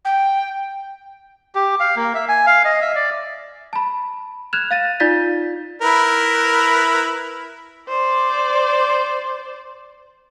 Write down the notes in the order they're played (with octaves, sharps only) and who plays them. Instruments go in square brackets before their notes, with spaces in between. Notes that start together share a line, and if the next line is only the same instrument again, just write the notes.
[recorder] G5
[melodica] G4
F5
A#3
E5
G#5
F5
D#5
E5
D5
[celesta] A5 B5
F6 F#6 G#6 E7 F7
F5 A6 D#7
D#4 F4 D5 G6 A6 B6
[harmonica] E4 A#4 B4
[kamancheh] C5 D5